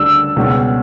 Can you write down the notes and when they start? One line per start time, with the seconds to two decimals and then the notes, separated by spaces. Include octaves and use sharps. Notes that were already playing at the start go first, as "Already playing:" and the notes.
Already playing: D2 C#3 G3 D4 E6
0.36 C#2 B2 G3 C#4 G4